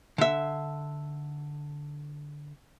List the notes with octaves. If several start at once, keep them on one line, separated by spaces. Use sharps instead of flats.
D3 E5